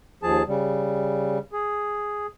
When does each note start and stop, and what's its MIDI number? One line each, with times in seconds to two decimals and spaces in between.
0.23 0.43 39
0.23 0.43 53
0.23 0.43 68
0.23 0.43 81
0.48 1.38 49
0.48 1.38 55
1.53 2.26 68